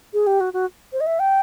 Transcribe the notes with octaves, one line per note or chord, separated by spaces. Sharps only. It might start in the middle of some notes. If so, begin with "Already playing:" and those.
G#4
G4
F#4
F#4
C5
D#5
E5
G5